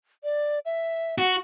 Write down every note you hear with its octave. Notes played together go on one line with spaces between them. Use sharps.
D5
E5
F#4 F#5